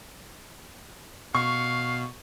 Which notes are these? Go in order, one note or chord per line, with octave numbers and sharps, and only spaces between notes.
B2 F5 C#6